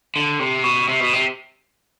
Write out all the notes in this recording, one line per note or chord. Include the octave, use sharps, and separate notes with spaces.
D3
C3
B2
C3
B2
C3